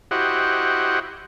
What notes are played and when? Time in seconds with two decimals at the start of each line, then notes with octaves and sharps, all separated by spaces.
0.11 E4 F#4 G4 C5 D#5 F#5